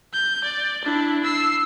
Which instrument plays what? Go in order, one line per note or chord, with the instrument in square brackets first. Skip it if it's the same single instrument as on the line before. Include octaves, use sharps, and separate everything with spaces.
[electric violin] G6
D5
D4 E4
E6 C7